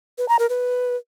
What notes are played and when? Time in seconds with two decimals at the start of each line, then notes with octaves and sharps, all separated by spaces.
0.18 B4
0.29 A#5
0.39 A#4
0.50 B4